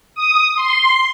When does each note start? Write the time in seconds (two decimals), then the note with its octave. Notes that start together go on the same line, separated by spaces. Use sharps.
0.15 D#6
0.56 C6